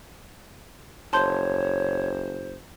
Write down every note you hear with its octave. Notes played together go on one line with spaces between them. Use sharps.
F#1 C5 C#5 A5 C6 G6